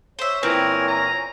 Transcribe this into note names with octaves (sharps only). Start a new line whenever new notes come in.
C5 C#5 E5
A#2 E3 C4 A#4 G#5
A#5